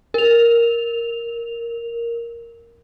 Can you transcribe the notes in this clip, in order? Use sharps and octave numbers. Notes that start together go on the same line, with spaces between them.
A#4 F7